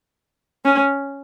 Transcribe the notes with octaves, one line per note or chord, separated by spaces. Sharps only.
C#4